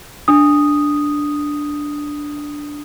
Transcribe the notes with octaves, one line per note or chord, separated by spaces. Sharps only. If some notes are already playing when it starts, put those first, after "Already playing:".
D4 D#6